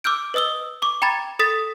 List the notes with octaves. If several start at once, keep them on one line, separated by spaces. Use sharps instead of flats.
D6 E6 F6 G6 D7
B4 D#5 D#6 E6 G7
C#6 D6
G5 A#5 B5 G#6 A6
A4 D#6 A6 B6 E7